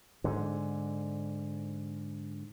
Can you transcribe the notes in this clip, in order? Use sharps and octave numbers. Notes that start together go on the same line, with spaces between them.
G#2 D3